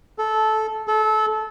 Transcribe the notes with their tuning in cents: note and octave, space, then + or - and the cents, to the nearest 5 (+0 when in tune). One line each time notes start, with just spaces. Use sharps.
A4 -15
A4 -25